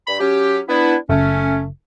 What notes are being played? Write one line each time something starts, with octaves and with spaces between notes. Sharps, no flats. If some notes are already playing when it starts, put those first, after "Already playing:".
G2 B5
F#3 C#4 G4
B3 D4 E4
F#1 A3 C#4